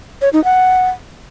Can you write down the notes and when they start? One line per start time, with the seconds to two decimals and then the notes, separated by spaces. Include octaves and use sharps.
0.22 C#5
0.33 D#4
0.44 F#5